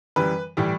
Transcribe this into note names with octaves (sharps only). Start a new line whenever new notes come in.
F#2 E3 G3 B4
A2 E3 G3